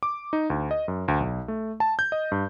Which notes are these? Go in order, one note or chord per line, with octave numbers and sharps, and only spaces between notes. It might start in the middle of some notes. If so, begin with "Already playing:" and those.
D6
D#4
D2
D#5
F#2
D2
B1
A3
A5
G6
D#5
G2